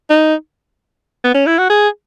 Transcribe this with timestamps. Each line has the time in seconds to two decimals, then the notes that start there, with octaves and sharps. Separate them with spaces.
0.10 D#4
1.24 B3
1.35 C#4
1.47 E4
1.59 F#4
1.70 G#4